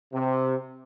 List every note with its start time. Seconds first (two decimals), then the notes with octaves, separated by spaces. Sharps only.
0.13 C3